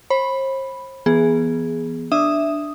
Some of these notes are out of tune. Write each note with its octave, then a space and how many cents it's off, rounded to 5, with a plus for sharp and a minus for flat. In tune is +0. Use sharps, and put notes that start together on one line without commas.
C5 +40 B5 +0
E3 +25 B3 -15 G#4 +0
D4 +5 E5 +0 D#6 +0